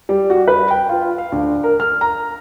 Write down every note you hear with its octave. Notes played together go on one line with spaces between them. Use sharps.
G3
F#4
B4
G5
F4
F5
D2
A#4
F6
A#5